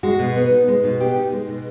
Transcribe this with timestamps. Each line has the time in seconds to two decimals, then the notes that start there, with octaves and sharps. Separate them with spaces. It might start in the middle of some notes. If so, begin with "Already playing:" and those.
0.03 G#3 F#4
0.19 B2
0.36 B3
0.51 D#4
0.68 G#3
0.84 B2
1.00 B3 G4
1.16 D#4
1.32 G#3
1.48 B2